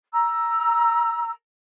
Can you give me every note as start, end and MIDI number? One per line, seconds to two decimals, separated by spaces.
0.13 1.32 82
0.13 1.32 88